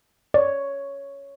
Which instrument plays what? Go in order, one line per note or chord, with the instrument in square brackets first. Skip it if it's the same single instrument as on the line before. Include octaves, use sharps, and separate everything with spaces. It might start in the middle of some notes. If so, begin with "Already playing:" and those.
[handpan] C#5 [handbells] D5